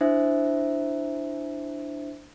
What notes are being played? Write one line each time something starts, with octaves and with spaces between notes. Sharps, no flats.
D4 E4 C5 E5